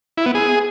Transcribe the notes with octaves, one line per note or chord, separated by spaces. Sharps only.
E4
B3
G#4